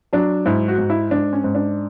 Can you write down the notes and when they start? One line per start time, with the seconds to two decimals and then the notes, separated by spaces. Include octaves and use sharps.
0.13 F#3 D4
0.46 G#2 E4
0.68 F#4
0.78 G#2
0.90 E4
1.11 G#2 D4
1.33 C#4
1.44 G#2
1.55 D4